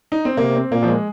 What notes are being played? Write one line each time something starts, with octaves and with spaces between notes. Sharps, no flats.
D#4
C4
C3 A#3
C4
A#2 A#3
F3
G#3